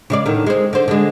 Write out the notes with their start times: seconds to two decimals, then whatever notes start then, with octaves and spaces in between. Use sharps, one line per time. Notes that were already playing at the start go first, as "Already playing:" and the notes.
0.10 C#3 G#3 D5
0.26 A2 D3 D#3
0.46 G#3 C4
0.73 D3 C5
0.88 D3 G#3